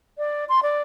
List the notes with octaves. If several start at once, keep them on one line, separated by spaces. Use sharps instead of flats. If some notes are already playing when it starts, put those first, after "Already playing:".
D5
C6
D5